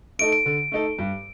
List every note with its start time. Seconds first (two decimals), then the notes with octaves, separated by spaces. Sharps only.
0.19 A3 D#4 A4 D7
0.32 D7
0.46 D3
0.72 A3 D#4 A4
0.99 G2